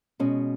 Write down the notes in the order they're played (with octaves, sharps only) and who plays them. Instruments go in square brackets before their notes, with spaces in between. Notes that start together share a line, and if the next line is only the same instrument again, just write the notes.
[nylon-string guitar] B2 G#3 C#4